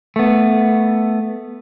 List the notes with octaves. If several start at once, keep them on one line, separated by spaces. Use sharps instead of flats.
A3 B3